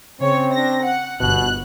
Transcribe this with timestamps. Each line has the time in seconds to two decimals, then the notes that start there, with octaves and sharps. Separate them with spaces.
0.20 C#3 C4 C#5
0.53 D4 A#6
0.83 F#5
1.20 G1 B2 F#6